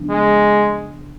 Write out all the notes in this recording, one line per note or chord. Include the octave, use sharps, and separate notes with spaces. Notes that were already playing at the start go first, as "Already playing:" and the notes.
Already playing: C#3 F3 B3 D4
G#3